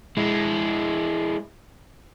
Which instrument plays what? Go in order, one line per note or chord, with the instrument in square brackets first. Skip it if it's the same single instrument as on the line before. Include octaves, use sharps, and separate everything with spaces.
[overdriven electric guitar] G#3 E4